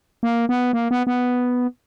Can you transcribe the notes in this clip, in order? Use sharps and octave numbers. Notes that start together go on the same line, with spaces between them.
A#3
B3
A#3
B3
B3